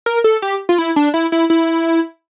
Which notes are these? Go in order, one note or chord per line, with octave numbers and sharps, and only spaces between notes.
A#4
A4
G4
F4
E4
D4
E4
E4
E4